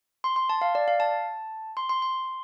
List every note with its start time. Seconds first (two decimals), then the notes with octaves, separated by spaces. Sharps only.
0.24 C6
0.36 C6
0.49 A5
0.61 F5
0.75 D5
0.88 F5
1.00 A5
1.77 C6
1.89 C6
2.02 C6